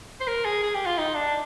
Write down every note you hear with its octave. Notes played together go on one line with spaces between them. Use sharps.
C5
A#4
G#4
G#4
G4
F4
D#4
D4